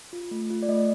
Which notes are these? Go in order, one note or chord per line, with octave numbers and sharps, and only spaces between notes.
F4
A3
F4
D5
A3 D#5